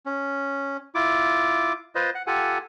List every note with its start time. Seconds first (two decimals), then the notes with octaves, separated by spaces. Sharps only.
0.06 C#4
0.95 E4 F4 D6
1.95 F4 B4 C5 D#5
2.15 F#5
2.27 F4 G4 A4 F#5 G#5